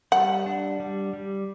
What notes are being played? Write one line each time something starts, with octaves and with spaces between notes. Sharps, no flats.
G3 F#5
D4
G3
G3